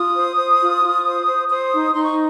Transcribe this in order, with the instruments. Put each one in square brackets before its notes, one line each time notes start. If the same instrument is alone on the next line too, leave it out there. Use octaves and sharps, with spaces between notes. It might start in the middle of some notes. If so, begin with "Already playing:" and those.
Already playing: [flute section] F4 D#6
C5
C5
F4
F4
C5
C5
C5 D#6
D#4
D#4 C6
C#6